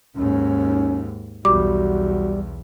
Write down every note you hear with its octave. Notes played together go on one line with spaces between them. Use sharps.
D#2 G#2 C#4
B1 E2 G3 F#4 D6